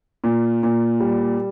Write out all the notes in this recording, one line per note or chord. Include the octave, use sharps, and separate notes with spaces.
A#2
A#2
G3